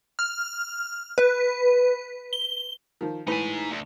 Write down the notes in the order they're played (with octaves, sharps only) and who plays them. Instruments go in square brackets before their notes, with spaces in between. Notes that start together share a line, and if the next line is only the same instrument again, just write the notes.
[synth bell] F6
B4
G7
[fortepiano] D#3 F3
[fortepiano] A2 E3 B4 [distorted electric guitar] D#4 G#5
[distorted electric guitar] D2